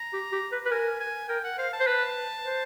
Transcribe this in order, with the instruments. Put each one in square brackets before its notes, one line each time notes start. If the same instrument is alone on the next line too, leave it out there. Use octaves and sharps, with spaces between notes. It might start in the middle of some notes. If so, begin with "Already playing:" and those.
Already playing: [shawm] A#5
[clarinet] G4
G4
B4
B4
[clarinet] A#4 [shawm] G#5
[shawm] G#5
[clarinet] A#4 [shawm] G5
[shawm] F#5
[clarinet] C5 [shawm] F5
[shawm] A5
[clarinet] C5
[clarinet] B4 [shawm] A5
[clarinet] C5